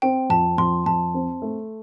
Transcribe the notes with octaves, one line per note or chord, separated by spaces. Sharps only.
C4 G5
F2 A5
F2 C6
F2 A5
C4
A3